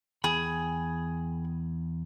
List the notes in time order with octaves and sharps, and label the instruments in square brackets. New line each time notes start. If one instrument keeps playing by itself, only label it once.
[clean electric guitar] E2 G5 B5 [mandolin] G#4